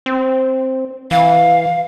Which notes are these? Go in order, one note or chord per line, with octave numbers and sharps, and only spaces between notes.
C4
E3 F5